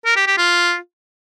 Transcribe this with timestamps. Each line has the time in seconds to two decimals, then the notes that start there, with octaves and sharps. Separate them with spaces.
0.06 A#4
0.16 G4
0.27 G4
0.37 F4